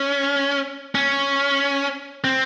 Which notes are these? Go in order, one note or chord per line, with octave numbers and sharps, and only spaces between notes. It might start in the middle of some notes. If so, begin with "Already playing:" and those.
Already playing: C#4
C#4
C4